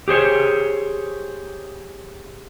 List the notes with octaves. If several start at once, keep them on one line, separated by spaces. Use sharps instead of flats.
G4 G#4 C5 C#5